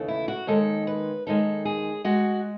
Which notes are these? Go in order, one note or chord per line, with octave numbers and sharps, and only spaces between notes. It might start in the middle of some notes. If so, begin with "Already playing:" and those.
Already playing: D#2 C#3 E3 A3
E4
F#4
D#2 D#3 G#3 A4
B4
D#2 D#3 G#3 A4
G#4
G#3 F#4